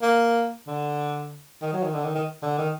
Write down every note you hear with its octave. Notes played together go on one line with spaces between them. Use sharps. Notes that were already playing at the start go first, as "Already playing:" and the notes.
A#3
D3
D#3
F#3
D#3
D3
D#3
D#3
D3
D#3